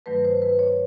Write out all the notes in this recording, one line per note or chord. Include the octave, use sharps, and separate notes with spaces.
G2 D#3 F#3 A3 B4
C5
B4
C#5